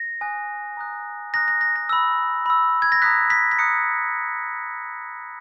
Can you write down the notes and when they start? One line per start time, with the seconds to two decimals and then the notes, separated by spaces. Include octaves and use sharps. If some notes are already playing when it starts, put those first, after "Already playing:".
Already playing: A#6
0.21 G#5 D#6 F#6
0.77 A#5 D#6 F#6
1.34 A#5 D#6 F#6 A#6
1.48 A#6
1.61 A#6
1.76 A#6
1.89 B5 E6
2.46 B5 E6
2.82 G#6
2.92 A#6
3.02 A#5 D#6 F#6 B6
3.30 B6
3.52 B6
3.58 A#5 D#6 F#6 C#7